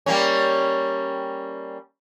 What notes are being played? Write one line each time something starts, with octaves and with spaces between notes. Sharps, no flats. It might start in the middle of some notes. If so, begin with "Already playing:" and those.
G3 A#3 C#4